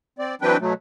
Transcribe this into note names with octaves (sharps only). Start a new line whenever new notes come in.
C4 D5
E3 F#3 C4 D4 B4 G5
B2 F#3 A3